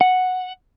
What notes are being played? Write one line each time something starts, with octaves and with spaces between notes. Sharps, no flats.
F#5